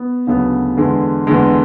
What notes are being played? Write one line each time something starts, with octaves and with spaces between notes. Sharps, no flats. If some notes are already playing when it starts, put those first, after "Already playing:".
Already playing: B3
D2 C#3 F#3 B3
E2 D3 G#3
E2 D3 G#3